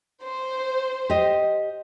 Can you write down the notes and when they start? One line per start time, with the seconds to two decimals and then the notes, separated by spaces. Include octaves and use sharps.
0.22 C5
1.10 G4 D#5